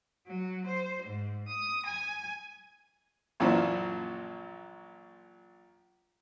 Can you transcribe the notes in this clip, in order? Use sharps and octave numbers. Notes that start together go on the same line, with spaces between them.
F#3
C5
G#2
D#6
G#5
A#1 F#2 A#2 E3 F3